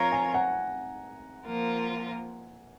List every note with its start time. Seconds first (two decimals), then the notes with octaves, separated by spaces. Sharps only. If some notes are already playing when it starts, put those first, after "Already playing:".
Already playing: F3 C4 F4 A#4 C#5 A#5
0.12 G#5
0.34 F#5
1.45 F3 A#3 F4 A#4